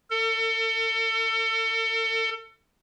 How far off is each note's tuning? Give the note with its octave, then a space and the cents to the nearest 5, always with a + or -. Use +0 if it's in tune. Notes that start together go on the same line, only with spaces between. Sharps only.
A4 +35